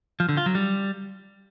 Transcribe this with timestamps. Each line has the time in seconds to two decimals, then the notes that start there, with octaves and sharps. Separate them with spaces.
0.20 F3
0.29 D3
0.37 F4
0.46 F#3
0.55 G3